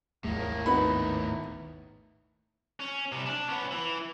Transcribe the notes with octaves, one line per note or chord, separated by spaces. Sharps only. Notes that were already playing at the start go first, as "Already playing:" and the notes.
G#1 D#2 A2 G#3 A#3
B3 D#4 B5
C#4
C3 G3
D4
B3 C#4
E3